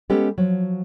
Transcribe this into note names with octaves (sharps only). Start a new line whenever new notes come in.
G#3 B3 C#4 G4 A4
F3 F#3